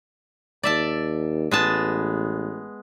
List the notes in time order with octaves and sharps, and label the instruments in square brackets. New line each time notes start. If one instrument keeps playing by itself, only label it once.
[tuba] D#2 [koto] D5 E5 A5
[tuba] A1 [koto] G#3 B3 A5